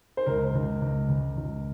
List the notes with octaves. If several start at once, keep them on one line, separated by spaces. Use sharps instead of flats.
C5
C#2 A#4
C#2
C#2
C#2
C#2